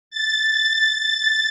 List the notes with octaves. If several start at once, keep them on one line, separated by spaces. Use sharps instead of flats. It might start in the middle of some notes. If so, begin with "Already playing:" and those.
A6